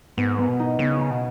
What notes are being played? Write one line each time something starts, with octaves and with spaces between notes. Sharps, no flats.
G#2 B3
B3
B2
D#4
C#3 B3
D#4
B2